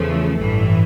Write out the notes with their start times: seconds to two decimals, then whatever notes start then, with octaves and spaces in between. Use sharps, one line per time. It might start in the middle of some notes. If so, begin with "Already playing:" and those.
Already playing: E2 C#3 F3 A3
0.37 A1 G2 E3